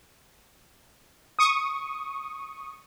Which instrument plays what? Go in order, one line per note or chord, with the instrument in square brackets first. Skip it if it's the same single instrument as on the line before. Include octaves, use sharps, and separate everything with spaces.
[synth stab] C#6 D#6